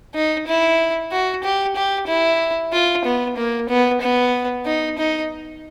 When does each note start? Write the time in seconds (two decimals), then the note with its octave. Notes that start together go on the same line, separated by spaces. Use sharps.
0.15 D#4
0.48 E4
1.12 F#4
1.44 G4
1.76 G4
2.08 E4
2.73 F4
3.05 B3
3.37 A#3
3.69 B3
4.01 B3
4.66 D#4
4.98 D#4